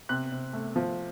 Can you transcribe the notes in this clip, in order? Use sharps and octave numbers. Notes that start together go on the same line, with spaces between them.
C3 F#6
C3
A3
F3